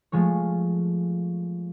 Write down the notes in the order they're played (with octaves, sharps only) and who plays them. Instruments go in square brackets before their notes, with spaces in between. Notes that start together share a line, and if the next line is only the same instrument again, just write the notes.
[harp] F3 G#3 A3 C#5